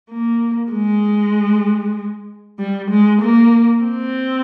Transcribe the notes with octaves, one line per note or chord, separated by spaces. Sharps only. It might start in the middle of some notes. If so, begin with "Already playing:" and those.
A#3
G#3
G3
G#3
A#3
C4